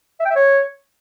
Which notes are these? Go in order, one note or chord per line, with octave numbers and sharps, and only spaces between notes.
E5
G5
E5
C#5